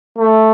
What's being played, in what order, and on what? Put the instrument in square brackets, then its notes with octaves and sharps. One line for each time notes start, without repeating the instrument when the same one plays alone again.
[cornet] A3